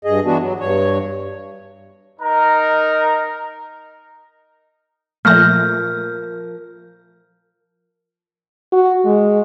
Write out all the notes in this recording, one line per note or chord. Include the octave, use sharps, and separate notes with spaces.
G2 G#4 D#5
E3 B3 D4 F#4
F#3
G2 C#5
D#4 A#4 A#5
A#2 F3 A3 A#4 F6 G6 A#6
F#4
G#3